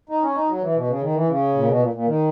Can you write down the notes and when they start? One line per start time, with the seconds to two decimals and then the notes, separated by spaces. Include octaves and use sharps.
0.09 D#4
0.22 C#4
0.36 D#4
0.49 F#3
0.61 E3
0.75 B2
0.88 C#3
1.01 D#3
1.14 E3
1.28 C#3
1.55 A#2
1.67 B2
1.80 A#2
1.93 A#2
2.07 D#3